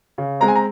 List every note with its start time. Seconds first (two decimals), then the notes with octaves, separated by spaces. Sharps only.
0.18 C#3
0.40 G#3 C4 A#5
0.48 G#5
0.55 A#5